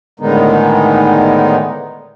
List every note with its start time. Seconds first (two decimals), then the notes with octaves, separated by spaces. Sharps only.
0.20 A2 D3 D#3 G#3 B3 D#4